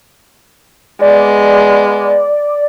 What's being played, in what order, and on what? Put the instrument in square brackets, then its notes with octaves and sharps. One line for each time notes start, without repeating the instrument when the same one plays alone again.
[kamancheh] G#3 B3 [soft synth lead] D5